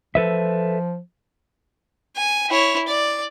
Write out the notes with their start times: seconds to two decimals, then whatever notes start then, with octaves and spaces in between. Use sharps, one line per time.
0.15 F3 A4 B4 E5
2.16 G#5
2.49 E4 C#5
2.88 D5